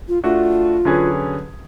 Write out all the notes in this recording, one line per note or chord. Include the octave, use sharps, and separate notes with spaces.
F4
A3 D4 F4 F#4
D3 F#3 C#4 G#4 B4